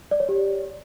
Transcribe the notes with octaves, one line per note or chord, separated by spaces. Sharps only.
D5
C#5
G4